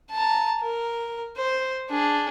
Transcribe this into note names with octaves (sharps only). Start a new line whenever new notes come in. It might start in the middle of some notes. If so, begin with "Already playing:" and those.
A5 A#5
A#4
C5
D4 G#4